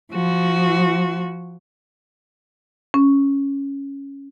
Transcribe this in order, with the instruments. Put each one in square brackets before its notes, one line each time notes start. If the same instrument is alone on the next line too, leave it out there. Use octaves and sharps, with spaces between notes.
[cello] F3 F#4
[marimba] C#4